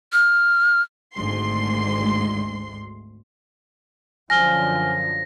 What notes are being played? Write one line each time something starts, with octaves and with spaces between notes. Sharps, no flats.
F6
G#1 D2 G#2 C6
F#2 D3 F3 G#5 F6 A#6 G7